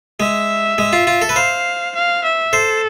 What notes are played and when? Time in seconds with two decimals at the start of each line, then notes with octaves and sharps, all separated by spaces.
0.20 G#3 E5
0.78 G#3
0.93 F4
1.07 F4
1.22 A4
1.29 B4
1.36 C5 F5
1.95 F5
2.24 E5
2.53 A4 C5